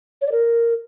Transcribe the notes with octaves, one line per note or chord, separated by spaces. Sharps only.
C#5
D5
A#4